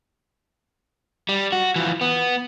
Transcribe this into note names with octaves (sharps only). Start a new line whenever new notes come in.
G3
F#4
E3 F3
B3